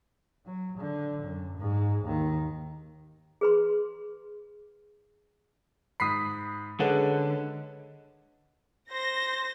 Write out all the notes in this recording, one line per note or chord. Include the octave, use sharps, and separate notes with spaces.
F#3
D3
F#2
G#2
D#2 D#3
G#4 B4 C6
G#2 B5 D#6 B6 C7
D3 G#3 C#4 A4 B4 F#5
C5 A#6